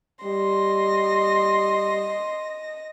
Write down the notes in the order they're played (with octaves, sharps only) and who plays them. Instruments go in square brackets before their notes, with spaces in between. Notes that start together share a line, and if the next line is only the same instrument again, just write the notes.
[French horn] G3 [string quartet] D#5 A#6 [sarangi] C6